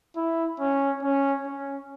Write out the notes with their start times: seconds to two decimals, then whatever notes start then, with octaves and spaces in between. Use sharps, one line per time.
0.16 E4
0.60 C#4
1.03 C#4
1.47 C#4